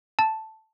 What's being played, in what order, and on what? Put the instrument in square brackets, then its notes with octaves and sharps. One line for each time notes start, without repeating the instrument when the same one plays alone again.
[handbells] A5